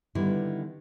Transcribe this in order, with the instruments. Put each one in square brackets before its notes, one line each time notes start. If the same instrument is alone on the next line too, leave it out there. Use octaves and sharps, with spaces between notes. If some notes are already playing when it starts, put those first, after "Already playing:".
[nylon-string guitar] D3 D#3 G3 B3 E4